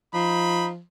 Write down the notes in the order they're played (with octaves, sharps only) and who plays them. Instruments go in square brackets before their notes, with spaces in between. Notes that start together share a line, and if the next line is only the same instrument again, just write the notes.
[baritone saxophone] F3 [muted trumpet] D#4 [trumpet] B5